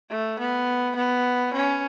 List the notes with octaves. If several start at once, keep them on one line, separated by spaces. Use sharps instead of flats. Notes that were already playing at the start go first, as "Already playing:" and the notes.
A3
B3
B3
C#4